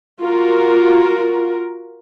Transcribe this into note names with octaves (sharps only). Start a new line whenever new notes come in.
F4 F#4 A#4